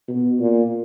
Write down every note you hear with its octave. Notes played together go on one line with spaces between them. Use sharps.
B2
A#2